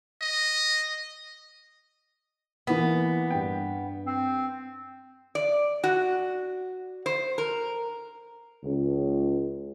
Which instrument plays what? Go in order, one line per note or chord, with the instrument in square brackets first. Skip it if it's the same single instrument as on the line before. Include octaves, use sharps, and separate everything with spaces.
[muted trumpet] D#5
[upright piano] E3 A#3 [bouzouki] B3
[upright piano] G2 G5
[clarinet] C4
[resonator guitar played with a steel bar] D5
F#4
C5
A#4
[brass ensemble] C#2